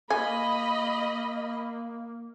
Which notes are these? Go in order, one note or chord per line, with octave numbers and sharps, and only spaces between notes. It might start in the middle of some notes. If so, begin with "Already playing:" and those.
A#3 D#5 G#5 B5